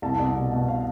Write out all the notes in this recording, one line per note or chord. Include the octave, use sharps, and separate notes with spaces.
C2 A5
C2
B2
B2
F5